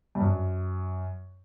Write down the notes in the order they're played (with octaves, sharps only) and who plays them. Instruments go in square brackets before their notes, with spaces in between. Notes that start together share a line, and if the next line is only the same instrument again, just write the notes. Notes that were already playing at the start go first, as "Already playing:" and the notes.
[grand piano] G2
F#2